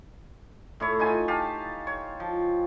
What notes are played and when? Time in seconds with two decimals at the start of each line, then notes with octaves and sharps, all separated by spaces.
0.80 A2 E4 C#5
0.99 D#4 F4 G#5
1.28 G4 F5 A5
1.87 C#5
2.20 F3